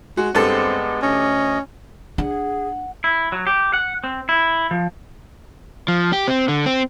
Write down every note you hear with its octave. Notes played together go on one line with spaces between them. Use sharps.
G#3 F#4
G2 G#3 B3 C4 A4
D2 C#4 D#5
D4 G#4 F#5
E4
F#3
G4
F#5
C4
E4
F3
F3
G4
C4
D3
C4